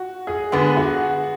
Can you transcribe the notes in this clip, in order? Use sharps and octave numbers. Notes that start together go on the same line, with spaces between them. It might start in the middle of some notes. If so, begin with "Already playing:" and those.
Already playing: F#4
G#4
D3 G#3 B3 G#4
F#4